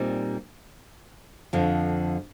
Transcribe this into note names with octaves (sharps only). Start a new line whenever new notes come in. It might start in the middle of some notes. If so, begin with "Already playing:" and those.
Already playing: A#2 G3 C4 D#4
F2 D3 F3